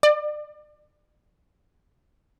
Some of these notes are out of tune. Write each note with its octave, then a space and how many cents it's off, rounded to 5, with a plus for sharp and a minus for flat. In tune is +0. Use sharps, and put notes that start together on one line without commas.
D5 +35